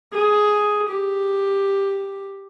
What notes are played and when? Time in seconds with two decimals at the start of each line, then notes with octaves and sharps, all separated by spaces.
0.13 G#4
0.89 G4